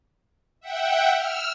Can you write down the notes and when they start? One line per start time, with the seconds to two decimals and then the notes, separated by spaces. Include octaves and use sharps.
0.60 E5 F#5 G5
1.12 E6 F6